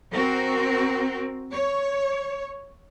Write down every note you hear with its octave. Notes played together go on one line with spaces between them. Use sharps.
C4 F#4 A#4
C#5